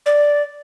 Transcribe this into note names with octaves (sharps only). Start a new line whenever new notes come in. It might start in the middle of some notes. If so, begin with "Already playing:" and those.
D5